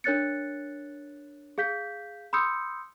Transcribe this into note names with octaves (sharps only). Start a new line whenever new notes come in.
D4 A#4 C#5 F#6 A6 C#7
G#4 F5 G6 B6
B5 C6 D#6 E6 G6 C#7